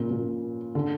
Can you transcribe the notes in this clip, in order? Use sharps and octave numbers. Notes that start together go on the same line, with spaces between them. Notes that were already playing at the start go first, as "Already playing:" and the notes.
Already playing: A#2 C#3
A#2
D3